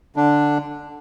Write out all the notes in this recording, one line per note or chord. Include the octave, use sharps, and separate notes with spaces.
D3 D4